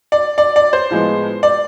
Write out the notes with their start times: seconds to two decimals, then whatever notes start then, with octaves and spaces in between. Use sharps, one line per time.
0.12 D5
0.38 D5
0.56 D5
0.73 C5
0.90 A2 F3 G#3 B3
1.43 D5